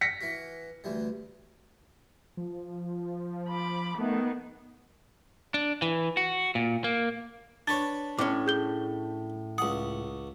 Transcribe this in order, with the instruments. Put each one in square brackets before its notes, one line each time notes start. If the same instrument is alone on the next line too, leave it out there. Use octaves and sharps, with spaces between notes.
[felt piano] A#6 B6 C#7
[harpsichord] E3 F#4
D2 E3 G3
[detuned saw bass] F3
[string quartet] B5 D6
[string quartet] D#3 B3 [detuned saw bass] A3
[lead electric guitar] D4
E3
F#4
A#2
A#3
[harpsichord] D4 B4 C#5 [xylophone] A6
[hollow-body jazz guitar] A2 C#4 [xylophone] D6
[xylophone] G#4 G6 G7
[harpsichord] C#2 F#5 [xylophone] D#6